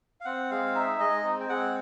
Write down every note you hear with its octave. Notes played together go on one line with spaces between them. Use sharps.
F5
C4 F#5
G#3 F5
D#4 E5
G#3 D#5
C4
G5
G#3 F#5